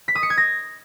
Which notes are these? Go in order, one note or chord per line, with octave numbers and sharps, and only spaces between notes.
B6
D#6
C#7
G#6
A#6